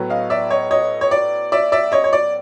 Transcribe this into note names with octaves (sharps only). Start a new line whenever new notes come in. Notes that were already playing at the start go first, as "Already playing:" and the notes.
Already playing: A2 F#3 B3
D#5 F5
D5 E5
C#5 D#5
C#5 D#5
C#5
D5
D5 E5
D5 E5
C#5 D#5
C#5
D5